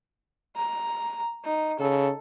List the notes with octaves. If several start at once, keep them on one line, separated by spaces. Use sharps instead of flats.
A#5
D#4
C#3 A4